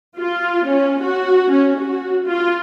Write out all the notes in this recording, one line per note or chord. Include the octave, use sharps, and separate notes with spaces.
F4
C#4
F#4
C#4
F#4
F4